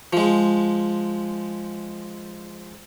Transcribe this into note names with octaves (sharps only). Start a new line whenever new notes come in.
F3 G#3